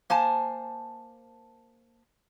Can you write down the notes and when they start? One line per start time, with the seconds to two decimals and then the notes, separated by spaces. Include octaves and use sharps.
0.10 A#3 C5 G#5 A5